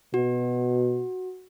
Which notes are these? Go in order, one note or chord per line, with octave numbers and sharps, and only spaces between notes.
B2 F#4